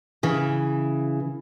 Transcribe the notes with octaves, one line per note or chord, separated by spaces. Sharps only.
C#3 E3